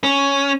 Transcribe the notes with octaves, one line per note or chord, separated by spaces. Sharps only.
C#4